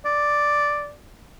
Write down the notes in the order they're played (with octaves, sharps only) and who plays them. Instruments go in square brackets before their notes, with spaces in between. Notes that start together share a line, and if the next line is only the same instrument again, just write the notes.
[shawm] D5